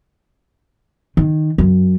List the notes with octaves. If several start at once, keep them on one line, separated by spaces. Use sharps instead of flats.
D#3
F#2